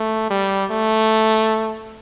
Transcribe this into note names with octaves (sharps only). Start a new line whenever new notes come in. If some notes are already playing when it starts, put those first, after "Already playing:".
Already playing: A3
G3
A3